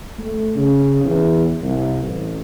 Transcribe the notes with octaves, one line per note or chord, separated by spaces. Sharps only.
A3
C#3
E2
C2
A1